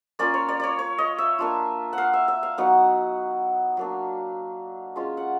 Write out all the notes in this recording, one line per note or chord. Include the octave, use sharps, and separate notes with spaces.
A#3 C#4 F4 D5
C#5
D5
C#5 D5
C#5
D#5
E5
A#3 D4 F4
F#5
F5
E5
E5
F5
F#3 B3 D#4 F#5
F#3 A#3 D4
G#3 C#4 F4
F#5